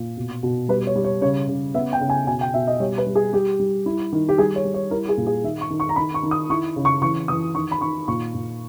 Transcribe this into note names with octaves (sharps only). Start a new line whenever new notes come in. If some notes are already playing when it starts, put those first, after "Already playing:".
Already playing: A#2
B2
B2
G3 B4
C#5
G3
C#5
C#3 C#5
C#3
B3 E5
G5
C#3
G#5
B2 G#5
G5
B2 E5
D#5
G3 C#5
B4
G3
G#4
G3 G4
G3
E4
D#3
G4
G3 G#4
C#5
G3
C#5
E4 A#4
G#4
A#2
G#4
D#3 E5
C#6
D#3
C#6
A#5
D#3 B5
C#6
D#3
D#6
E4 C#6
C#3
C#6
E3 C#6
E3 D#6
D#3 C#6
B5
D#3 C#6
A#2 C#6
A#2